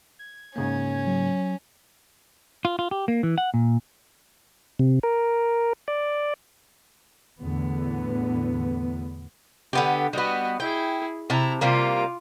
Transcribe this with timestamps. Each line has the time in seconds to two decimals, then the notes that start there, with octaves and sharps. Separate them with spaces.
0.19 G#6
0.56 G#2 C#3 A#3 C#4
1.06 F#3
2.65 F4
2.79 F4
2.91 G4
3.08 A#3
3.23 E3
3.38 F#5
3.54 A#2
4.79 C3
5.03 A#4
5.88 D5
7.40 E2 A2 D3 B3
9.73 D3 B3 G4
10.13 G3 B3 F#4 D#5
10.60 E4 G#4 G5
11.30 C3 E4 A5 A#5
11.61 C3 G3 A#3 F4 D6